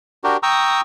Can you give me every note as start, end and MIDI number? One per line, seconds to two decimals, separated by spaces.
0.24 0.37 62
0.24 0.37 66
0.24 0.37 67
0.24 0.37 70
0.43 0.81 79
0.43 0.81 82
0.43 0.81 85
0.43 0.81 87
0.43 0.81 88